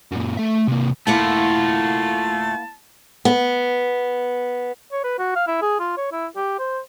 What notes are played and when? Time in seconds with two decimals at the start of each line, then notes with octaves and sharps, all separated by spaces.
0.12 F#2 A#2
0.37 A3 E5
0.68 C3 A#3
1.07 A3 A#3 E4 F4 F#5 A5
3.25 B3
4.92 C#5
5.03 B4
5.18 F#4
5.35 F5
5.47 E4
5.62 G#4
5.79 F4
5.97 C#5
6.12 E4
6.36 G4
6.59 C5